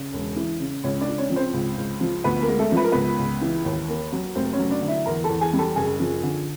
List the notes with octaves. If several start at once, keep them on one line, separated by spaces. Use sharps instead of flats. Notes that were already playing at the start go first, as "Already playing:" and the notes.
Already playing: C#3
E1
E3
C#3
C#2 C#4 C#5
D4 D5
C#2
C#4 C#5
F3
C4 C5
C#2
C#2
F3
D2 B3 B4
A#3 A#4
G#3
A3 A4
F3 B4
A#4
C#2 B3 B4
C#2
E3
D#2
A#3
F#3
F1 C4 C5
C#4 C#5
F#3
D4 D5
D3
E4 E5
E2 A#4 A#5
A4 A5
E2
G#4 G#5
G3
A4 A5
F#1 G#4 G#5
F3
D3